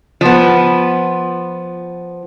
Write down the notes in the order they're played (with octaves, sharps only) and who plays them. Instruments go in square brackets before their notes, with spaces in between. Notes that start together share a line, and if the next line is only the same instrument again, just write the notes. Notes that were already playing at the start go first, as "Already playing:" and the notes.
[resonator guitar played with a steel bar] F3 B3